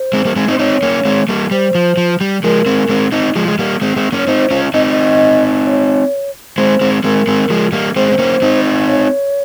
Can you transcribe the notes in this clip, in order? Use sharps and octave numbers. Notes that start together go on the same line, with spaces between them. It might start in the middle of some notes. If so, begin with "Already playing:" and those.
Already playing: C5
G#3 C4
G3 A#3
G#3 C4
C4 D#4
C5
C4 D#4 C#5
A#3 C#4
G#3 C4
G3 A#3
G3 C5
F3
F3
G3
F3 G#3 A#4
G#3 C4
G#3 C4
C4 D#4
F3 G#3
G#3
G3 A#3
G#3 C4
G#3 C4
A#3 C#4 C#5
C4 D#4 C5
C#4 F4
C4 D#4 D#5
D#5
C#5
G#3 C4 C5
G#3 C4
G#3 C4 A#4
G#3 C4
F3 G#3
G3 A#3
G#3 C4 C5
C4
A#3 C#4
C4 D#4
C#5